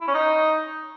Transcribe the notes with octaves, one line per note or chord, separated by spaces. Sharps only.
E4
C#4
D#4